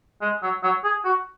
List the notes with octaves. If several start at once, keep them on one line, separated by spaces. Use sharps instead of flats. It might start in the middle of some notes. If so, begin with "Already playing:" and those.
G#3
F#3
F#3
G#4
F#4